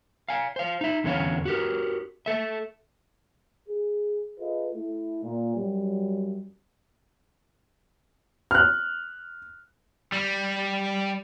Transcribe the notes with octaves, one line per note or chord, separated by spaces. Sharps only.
F5 G#5
C5 F5
D#4 E5
E2 D3 C#4 C#5 F5
F#4 G4 A#4
A4 E5
G#4
F4 G#4 A4 B4 D#5
A3 E4
A#2
F#2 F#3 G3
F6 F#6
G3